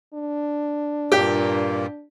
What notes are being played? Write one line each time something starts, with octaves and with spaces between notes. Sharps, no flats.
D4
G2 A#2 A#3 G4